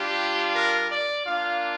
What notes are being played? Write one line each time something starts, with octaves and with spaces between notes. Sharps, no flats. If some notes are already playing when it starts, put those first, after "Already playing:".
Already playing: G3 D4 F4 G4
A#4
D5
A#3 D4 F4 F5